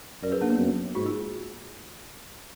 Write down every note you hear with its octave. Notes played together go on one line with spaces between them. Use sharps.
F#2 A#4 D5
G#4 B4
A#3 D4
B3
F#2
G#2 D#4 F#4
F4 G#4